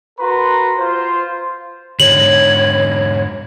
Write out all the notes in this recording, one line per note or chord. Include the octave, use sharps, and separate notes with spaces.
F#4 A#4 B4 A#5 C6
F4 C5
G#2 D3 C#5 F#7